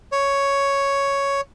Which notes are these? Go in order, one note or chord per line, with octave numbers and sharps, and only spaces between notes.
C#5